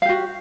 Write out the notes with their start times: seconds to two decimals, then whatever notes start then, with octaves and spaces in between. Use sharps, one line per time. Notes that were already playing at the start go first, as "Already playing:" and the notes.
0.02 F5
0.05 G4
0.09 F#4